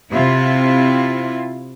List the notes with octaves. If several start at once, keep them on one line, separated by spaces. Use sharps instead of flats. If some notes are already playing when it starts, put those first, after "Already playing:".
C3 E4 F4